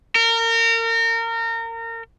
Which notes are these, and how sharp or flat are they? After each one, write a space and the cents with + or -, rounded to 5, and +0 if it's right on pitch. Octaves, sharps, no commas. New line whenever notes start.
A#4 -30